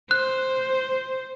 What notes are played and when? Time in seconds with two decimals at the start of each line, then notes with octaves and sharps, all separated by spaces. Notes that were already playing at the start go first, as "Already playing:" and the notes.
0.11 C5 F#6